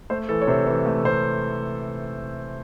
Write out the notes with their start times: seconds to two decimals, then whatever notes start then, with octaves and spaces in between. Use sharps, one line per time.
0.10 A3 C5
0.29 E3 A4
0.42 C#5
0.47 C3 C5
0.67 E3 C#5
0.86 A3
1.04 C3 C5